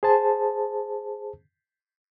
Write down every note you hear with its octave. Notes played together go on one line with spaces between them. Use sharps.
G#4 C5 A5